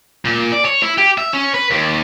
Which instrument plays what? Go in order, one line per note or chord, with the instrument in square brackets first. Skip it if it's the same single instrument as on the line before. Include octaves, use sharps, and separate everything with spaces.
[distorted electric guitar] A#2
D5
C#5
E4
G4
E5
C#4
B4
D#2